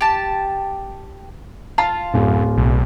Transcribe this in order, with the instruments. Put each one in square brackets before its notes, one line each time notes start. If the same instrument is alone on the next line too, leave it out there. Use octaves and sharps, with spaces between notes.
[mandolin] G4 A5
[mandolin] F4 [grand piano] A5
[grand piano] D1 [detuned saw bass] F#2
[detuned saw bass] B1